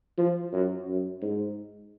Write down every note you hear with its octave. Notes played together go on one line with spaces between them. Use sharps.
F3
F#2
F#2
G#2